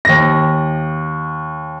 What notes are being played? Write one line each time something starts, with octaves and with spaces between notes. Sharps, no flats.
D#2 A#6